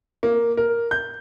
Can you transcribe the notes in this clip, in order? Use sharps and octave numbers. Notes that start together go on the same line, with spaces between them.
A#3
A#4
G6